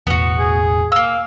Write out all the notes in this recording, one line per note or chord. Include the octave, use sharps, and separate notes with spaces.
E1 A1 E2 B3 F#4
G#4
A#3 F5 E6